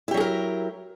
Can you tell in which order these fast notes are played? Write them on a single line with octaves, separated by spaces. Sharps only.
E4 G4 F#3 G#4 A#4